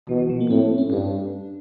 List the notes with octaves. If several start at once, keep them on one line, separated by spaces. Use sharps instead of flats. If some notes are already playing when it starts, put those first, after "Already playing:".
B2 E3
E3
F3
A#3
A2 C4
C4
C#4
G2 D4